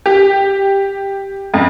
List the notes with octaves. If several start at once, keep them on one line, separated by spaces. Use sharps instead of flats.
G4
F2